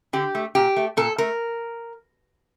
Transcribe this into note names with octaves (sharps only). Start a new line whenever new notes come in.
D3 G4
A3
A#2 G4
A3
A#2 A4
A3 A#4